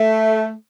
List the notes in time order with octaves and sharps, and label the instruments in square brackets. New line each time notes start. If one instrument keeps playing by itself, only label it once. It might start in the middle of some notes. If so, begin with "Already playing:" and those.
Already playing: [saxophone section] A3